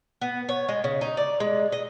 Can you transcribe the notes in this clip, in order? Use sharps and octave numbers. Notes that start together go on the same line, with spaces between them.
B3
C#5
G#3
C#3
D#4
D5
G#3
D#5